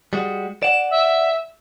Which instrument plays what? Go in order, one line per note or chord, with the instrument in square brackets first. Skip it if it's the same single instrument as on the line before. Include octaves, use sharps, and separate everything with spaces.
[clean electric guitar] G3 G#3 F#4
[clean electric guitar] D5 F#5 [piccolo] E7
[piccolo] E5